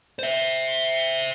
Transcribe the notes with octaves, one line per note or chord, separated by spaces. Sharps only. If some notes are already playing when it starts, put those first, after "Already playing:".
C5 E5